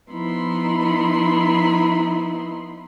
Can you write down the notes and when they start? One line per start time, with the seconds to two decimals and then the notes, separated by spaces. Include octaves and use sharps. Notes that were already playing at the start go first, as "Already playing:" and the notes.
0.10 F3 B3 D#4 E4 B5 C6